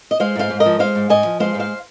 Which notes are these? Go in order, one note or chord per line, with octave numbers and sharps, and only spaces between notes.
D#5
G#3 C5 F5
G#2 C5 F5
G#2
A#4 D#5
F3
G#3 C5 F5
G#2
G#2 D#5 G#5
F3
G#3 C5 F5
G#2
C5 F5